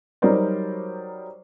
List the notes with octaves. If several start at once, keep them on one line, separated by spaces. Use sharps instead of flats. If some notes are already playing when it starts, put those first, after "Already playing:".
F#3 G3 D#4 A#4 C5 D5